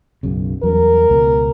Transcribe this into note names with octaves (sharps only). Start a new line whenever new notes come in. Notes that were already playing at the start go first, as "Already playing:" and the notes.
B1 F#2 C#3
E2 F#3 G3 A#4
C#2 B2